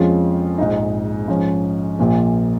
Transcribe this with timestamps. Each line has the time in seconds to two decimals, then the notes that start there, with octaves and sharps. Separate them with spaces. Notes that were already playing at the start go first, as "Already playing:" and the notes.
Already playing: F2 F3 G#3 C#4 F4
0.58 A#1 G#2 G#3 D#4
1.28 G#2 F3 C#4
1.99 A#1 A#2 F3